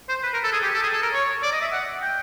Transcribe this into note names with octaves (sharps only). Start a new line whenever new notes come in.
C5
B4
A#4
A4
G#4
G4
A4
G#4
A4
A#4
C#5
D5
D#5
E5
F#5
G5